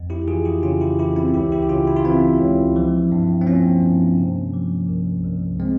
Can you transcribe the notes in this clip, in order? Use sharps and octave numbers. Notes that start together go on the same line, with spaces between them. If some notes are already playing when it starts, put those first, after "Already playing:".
Already playing: F2
E4 G4
E3 F4 G#4
E4 G4
C#3 C#4 F4
E4 G4
E3 E4 G4
C4 E4
C#2 E4 G4
E4 G4
G4
C#3 C#4 F4
E4
F4
E3 C4 E4
C#2
F3
G2
C4
F3 A#3 C#4
G2
C3
F3
C2
C2
G#3 C4